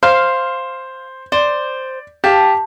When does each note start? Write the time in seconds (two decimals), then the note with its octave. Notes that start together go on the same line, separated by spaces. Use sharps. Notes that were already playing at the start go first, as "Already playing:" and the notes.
0.03 C5 F5
1.32 C5 D5
2.24 G4 F5 A5